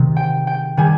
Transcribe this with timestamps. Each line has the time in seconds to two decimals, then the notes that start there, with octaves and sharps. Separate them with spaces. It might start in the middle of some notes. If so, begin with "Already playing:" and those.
Already playing: C3 D#3
0.16 G5
0.47 G5
0.77 D#3 G3 G#5